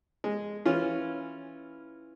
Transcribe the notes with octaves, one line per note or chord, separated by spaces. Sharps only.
G#3
E3 C#4 F4